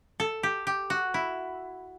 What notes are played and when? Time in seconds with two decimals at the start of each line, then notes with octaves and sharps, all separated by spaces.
0.20 A4
0.43 G4
0.67 G4
0.90 F#4
1.14 E4